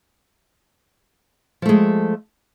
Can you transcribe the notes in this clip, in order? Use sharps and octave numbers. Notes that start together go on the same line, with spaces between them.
F3 G#3 A3